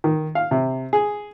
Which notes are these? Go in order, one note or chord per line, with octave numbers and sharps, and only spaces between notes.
D#3
F5
C3
G#4